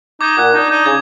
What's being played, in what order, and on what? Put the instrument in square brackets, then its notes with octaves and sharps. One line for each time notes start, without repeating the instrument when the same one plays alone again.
[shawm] D#4 [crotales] D6 G#6
[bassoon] A#2 [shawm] F#5
[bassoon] D4 [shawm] D#4
[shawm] D#4
[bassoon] C#3 [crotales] G#6